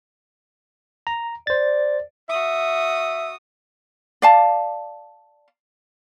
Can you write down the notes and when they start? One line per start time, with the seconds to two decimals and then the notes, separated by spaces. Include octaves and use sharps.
1.07 A#5
1.47 C5 D5 A6
2.29 F#4 E5 D#6
4.22 D5 F5 A5